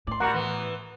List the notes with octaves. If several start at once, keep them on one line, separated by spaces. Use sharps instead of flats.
A2 D5 C6
G3 F#4 A#4 F#5 A#5 C6
E3 B3